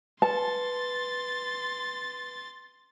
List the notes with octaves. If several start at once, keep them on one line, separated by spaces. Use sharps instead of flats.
B4 A5 C6 A6